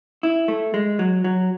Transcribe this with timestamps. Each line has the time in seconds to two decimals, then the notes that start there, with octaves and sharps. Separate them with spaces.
0.23 E4
0.48 A3
0.74 G#3
0.99 F#3
1.24 F#3